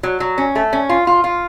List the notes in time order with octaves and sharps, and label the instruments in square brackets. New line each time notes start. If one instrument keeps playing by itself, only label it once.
[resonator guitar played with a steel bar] F#3
F#3
C#4
A3
C#4
F4
F4
F4